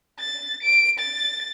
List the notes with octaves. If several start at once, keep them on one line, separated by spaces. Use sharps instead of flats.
A6
D7
A6